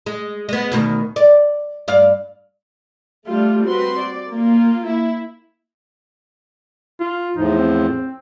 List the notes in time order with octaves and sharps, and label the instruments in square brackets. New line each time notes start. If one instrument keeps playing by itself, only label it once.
[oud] G#3
G#3 B3
D2 B2 D#3
D5
G2 D5 F5
[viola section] G3 A3 D4 F4
C4 F#4 B4 C6
D5
A#3 F4
E4
[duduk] F4
[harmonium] E2 A2 F3 [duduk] D#4
[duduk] C4